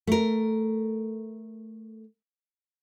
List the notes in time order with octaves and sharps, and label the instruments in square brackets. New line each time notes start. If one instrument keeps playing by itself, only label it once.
[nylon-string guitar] A3 A#4